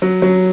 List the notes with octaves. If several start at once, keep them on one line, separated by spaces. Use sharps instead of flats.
F#3
F#3